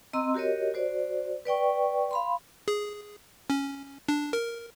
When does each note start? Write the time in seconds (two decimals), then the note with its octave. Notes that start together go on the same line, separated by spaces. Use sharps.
0.13 C4 D#5 A#5 C6 E6
0.34 F#4 G4 A#4 C#5 D#5
0.74 F#4 C5 D5
1.45 B4 D5 G5 C#6
2.11 F5 B5 C6
2.68 G#4
3.50 C#4
4.08 D4
4.33 A#4